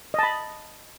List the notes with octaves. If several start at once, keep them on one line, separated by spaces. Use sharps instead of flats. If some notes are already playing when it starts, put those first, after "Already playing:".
D#5 A5 B5